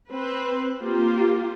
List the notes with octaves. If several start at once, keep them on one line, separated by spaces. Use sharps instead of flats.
C4 B4
A#3 F4 G4